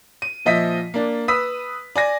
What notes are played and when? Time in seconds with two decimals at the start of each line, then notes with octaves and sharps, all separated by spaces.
0.22 D#7
0.45 A#2 F3 D#5 E5 B6
0.94 A#3 D4
1.28 B4 D#6 E6 B6
1.96 D5 G#5 A#6